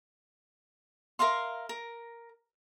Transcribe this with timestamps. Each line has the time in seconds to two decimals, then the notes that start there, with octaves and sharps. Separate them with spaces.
1.19 A#4 E5 F5 C6
1.69 A#4